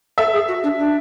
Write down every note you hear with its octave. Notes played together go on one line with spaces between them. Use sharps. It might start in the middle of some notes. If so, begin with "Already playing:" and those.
A4 E5
G#4
F#4
D4
D4